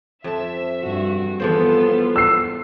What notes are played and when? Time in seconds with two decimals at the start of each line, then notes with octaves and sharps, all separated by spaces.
0.24 F2 E5 A5
0.83 G2 F#4
1.40 E2 F3 B3 F4 A4 C5
2.16 E6 C7